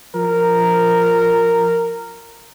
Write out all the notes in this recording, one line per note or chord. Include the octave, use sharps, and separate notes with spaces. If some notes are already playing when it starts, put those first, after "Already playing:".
F3 A#4